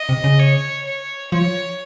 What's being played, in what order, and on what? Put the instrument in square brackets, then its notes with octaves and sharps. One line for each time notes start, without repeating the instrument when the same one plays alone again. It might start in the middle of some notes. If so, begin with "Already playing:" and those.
Already playing: [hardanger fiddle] D#5
[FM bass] C3
C#3
[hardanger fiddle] C#5
C#5
[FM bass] F3 [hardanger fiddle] C#5